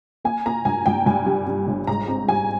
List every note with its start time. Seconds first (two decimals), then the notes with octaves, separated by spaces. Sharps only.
0.25 A#3 G#5
0.46 A#3 A#5
0.65 G2 G#5
0.86 G2 G5
1.06 G2 G#5
1.26 G3
1.47 G3
1.67 G1
1.87 G#2 A#5
2.08 C4
2.28 G3 G#5